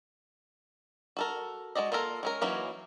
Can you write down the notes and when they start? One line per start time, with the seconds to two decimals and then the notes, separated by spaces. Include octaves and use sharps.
1.17 F#4 A4 A#4
1.75 G#3 D#4 F#4 D5 D#5
1.92 A#3 F4 A4 A#4
2.23 G#3 C#4 A#4
2.41 E3 F#3 A#3 C#4 D#4